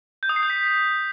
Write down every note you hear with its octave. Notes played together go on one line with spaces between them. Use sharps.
G6
D#6
C7
G6
B6